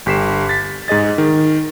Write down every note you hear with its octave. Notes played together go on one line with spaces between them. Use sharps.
G1 G4 B6 C7 E7
A6 B6
G#2 G#4 D#5 A6
D#3